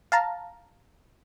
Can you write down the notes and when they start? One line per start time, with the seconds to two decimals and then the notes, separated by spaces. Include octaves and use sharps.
0.12 F5 A5 A#5